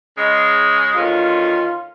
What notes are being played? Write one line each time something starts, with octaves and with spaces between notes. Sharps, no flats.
C#3 G#3
D2 D#3 C#4 F4